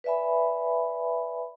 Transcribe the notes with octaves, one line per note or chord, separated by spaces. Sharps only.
B4 D5 E5 G#5 B5